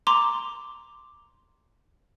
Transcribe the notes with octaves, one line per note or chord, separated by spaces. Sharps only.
A#5 C6 D6